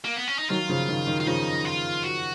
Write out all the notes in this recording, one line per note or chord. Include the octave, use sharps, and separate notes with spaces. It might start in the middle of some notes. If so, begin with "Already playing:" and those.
A#3
B3
C#4
D#4
D#3 F#3 F4
C#3 F3
D#3
D#3
F4
C#3 F3 D#4
F4
F#4